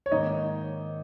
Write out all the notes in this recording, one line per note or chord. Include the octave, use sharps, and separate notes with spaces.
C#5
G#2 D#3 A#3 D#4 D#5